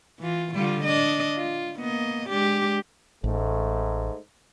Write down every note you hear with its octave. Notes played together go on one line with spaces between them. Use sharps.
E3 F4
D3 G3 F4
D4 D#5
F4
A#3 B3 D#5
G#3 D4 G4
A1 G#2 A3